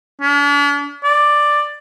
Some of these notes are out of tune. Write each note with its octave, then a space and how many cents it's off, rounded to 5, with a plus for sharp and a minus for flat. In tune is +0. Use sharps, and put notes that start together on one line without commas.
D4 -45
D5 +5